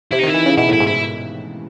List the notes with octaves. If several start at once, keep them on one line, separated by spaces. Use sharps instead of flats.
C3 E4
D#4
D#3 E4
E3
C#3
B2 E4
A2 E4
G#2
E4